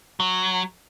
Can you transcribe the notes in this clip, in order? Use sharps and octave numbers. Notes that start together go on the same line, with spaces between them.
F#3